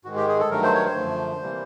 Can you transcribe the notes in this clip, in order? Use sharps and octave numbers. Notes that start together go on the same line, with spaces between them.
G#2 D#3 G#3 F#4
G4
G#4
A4
G2 D#3 F#3 A3 A#4
C5
C#5
C5
F#2 D3 F3 A3
C3 E3 G3 A#3